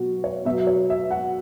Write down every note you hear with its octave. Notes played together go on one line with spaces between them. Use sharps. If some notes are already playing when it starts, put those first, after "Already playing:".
Already playing: B2 F#3 F#4
C#5
B2 F#3 E5
C#5
E5
F#5